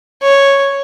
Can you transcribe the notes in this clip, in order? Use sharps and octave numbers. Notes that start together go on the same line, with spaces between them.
C#5